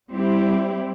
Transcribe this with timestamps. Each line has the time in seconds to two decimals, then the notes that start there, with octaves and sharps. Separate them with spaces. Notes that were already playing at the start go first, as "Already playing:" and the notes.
0.10 G3 C4 E4 G4